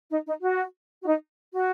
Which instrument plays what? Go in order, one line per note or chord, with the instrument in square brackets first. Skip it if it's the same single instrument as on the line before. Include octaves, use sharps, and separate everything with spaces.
[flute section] D#4
D#4
F#4
F#4
D#4
F#4